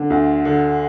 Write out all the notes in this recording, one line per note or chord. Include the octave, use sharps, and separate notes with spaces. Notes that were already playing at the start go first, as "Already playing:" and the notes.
Already playing: D3
D2
D3